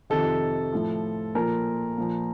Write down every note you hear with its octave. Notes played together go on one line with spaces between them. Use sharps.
F2 C3 D#3 A4
A2 F3
A#2 F3 A#4
A#2 F3